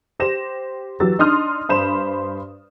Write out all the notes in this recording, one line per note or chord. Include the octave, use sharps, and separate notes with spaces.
G4 C5 A#6 E7
E3 F#3 G4 E6 A6
D4 D#4 C6 D#6 F6
G2 C5 B5 E7